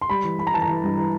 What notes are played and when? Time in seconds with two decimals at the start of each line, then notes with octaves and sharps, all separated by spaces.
0.01 C6
0.09 G3 B5
0.24 E3
0.38 G3 B5
0.47 A#5
0.54 E3 A5
0.62 A#5
0.68 E3
0.83 G2
0.98 E3